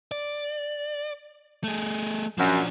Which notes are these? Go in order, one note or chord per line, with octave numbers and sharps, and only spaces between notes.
D5
A3 G#4
F#2 F3 D4